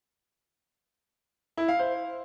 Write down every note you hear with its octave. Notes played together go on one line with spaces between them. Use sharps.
E4
F5
C5